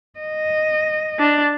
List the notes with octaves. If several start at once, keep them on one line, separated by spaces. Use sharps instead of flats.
D#5
D4